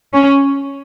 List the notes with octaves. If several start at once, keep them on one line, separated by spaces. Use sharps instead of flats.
C#4